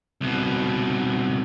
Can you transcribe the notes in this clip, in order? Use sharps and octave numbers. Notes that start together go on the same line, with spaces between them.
C2 B2